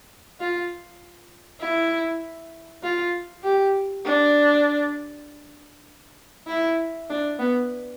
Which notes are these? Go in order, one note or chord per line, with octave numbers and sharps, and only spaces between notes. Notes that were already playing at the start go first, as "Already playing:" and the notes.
F4
E4
F4
G4
D4
E4
D4
B3